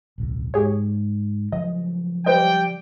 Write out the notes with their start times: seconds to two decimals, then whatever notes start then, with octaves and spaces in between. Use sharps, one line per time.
0.18 D1 B1
0.54 G#2 G4 G#4 C#5
1.52 C#3 F3 F#3 D#5
2.26 G3 B4 C5 D#5 G5